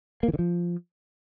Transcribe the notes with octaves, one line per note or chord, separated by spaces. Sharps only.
A#3
E3
D3
F3